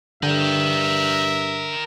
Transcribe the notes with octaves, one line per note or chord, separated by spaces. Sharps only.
G2 D3 A#4 E5 G5